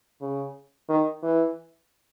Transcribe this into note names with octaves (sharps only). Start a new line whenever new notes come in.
C#3
D#3
E3